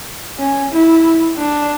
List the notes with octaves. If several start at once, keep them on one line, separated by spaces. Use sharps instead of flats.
C#4
E4
D4